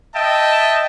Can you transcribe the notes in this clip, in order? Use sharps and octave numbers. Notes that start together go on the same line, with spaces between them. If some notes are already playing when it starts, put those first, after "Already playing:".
D#5 E5 G5 A5